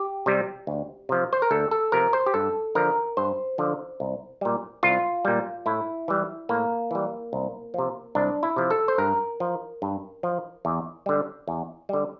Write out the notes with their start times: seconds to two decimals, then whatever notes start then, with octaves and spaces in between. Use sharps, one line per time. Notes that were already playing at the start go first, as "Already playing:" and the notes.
Already playing: G4
0.26 C3 G3
0.67 D2
1.09 C3 F3
1.33 C5
1.42 A#4
1.51 D2 A4
1.71 A4
1.92 C3 F3 A#4
2.13 C5
2.26 G4
2.34 G2 A4
2.75 D3 F3 A#4
3.17 G2 C5
3.58 D3 F3
4.00 C2
4.41 A#2 G3
4.83 C2 F4
5.25 A#2 G3
5.66 A2 E4
6.08 E3 G3
6.49 A2 A#3
6.91 E3 G3
7.33 C2
7.74 C3 F3
8.15 C2 D4
8.43 E4
8.56 C3 F3
8.71 A4
8.88 C5
8.98 G2 A#4
9.40 F3
9.82 G2
10.23 F3
10.65 E2
11.06 D3 G3
11.48 E2
11.89 D3 G3